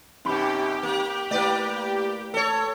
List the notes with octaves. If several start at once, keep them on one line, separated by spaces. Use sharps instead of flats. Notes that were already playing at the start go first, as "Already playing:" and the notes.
F#2 B2 C4 D#4 G4 B5
A#3
A3 A#3 E4 B4 D5 G5
A4 C#5